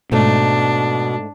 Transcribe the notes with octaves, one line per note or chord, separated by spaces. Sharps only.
G#2 B2 A3 D4